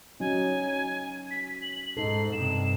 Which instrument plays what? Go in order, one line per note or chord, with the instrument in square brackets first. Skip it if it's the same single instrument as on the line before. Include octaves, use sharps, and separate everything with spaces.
[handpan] F#3 C#4 D#4 [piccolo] G#5
[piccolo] B6
F#7
[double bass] G#2 [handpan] D#4 A4 [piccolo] C7
[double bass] G2 C3 [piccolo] E7